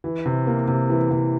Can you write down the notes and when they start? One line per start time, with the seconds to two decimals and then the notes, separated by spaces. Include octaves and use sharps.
0.04 E3
0.26 C3
0.47 A#3
0.68 C3
0.90 E3
1.11 C3